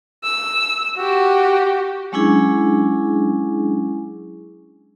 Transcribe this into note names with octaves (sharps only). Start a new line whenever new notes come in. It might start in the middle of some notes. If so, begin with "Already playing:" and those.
E6
F#4 G4
F#3 G#3 C#4 D4 E4 G#4